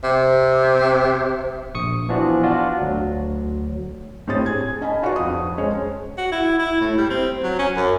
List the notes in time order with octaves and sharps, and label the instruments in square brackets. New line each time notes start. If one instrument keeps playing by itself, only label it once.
[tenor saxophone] C3
[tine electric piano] A#1 C#6 D#6 C#7
E3 F3 B3 D4 F4 F#4
D4 F4 F#4
D2 F#3
[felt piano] A2 C4 G4 C#5 D#6 A6
G#4 G#6
C#4 D#5 G#5 A5 B5
D#4 F4 F#4 B4 D5 C#6
F2 D#6
G#3 C#4 G#4 C5 C#5
[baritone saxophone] F#4
E4
E4
A2
G3
C4
F#3
C#4
F#2